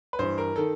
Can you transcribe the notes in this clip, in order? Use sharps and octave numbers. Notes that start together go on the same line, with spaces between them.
B4
G2 E3 C5
A#4
D#3 A4